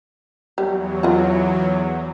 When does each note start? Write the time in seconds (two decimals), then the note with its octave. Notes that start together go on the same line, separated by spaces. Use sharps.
0.58 E2 F#3 G3
1.03 F4 F#4